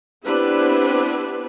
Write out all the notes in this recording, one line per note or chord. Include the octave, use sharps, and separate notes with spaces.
B3 C4 D4 E4 G4 B4